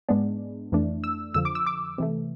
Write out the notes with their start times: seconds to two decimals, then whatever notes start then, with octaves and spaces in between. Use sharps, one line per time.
0.09 G#2 G#3 B3 D4
0.72 F2 E3 A3 D4
1.04 E6
1.34 F2 D3 F3 E6
1.45 D6
1.55 E6
1.66 D6
1.98 C3 E3 A3